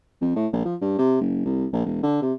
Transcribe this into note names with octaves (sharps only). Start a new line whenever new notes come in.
F2
A2
A#1
F3
G2
C3
F#1
C2
A#1
E1
D3
C3